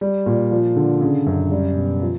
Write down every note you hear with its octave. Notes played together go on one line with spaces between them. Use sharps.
G3
A#2
F3
D3
C#3
F#2
G3
B2
F3